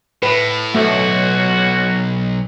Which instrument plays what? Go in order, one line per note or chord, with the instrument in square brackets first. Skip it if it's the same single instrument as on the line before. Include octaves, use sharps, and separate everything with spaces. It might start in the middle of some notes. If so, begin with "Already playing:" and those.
[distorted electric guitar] A2 [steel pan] B4
[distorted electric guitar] B1 [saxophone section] A#2 C#4 F#4 [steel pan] A3